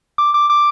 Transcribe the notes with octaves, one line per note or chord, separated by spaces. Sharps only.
D6
D6
D6